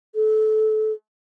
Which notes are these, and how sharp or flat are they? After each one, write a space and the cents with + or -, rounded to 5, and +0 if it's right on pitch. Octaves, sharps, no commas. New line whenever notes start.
A4 -25